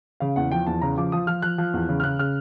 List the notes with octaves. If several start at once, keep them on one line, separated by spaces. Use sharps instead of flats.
C#3 F5
E2 F#5
F3 G5
E2 A5
C#3 A#5
F3 D6
F3 D#6
F3 F6
F3 F#6
F3
E2
C#3
F6
C#3 F#6
C#3 F6